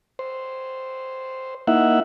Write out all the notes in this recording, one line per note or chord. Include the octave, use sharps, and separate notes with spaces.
C5
A#3 D#4 E4 E5 F#5